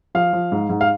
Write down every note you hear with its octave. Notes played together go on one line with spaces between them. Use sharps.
F3 F5
F3
G#2
G#2
F5